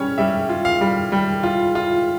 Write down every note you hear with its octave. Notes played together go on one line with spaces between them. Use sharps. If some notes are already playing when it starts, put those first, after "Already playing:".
Already playing: G3 C#4 C#5
G3 E5
F4
F5
G3
G3
F4
F4